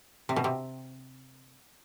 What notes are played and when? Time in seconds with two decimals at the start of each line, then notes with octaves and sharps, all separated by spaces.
0.29 C3
0.36 B2
0.44 C3